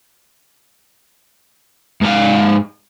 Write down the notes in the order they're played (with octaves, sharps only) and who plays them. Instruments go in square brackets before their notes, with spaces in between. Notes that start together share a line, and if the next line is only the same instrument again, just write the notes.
[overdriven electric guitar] G#2 F5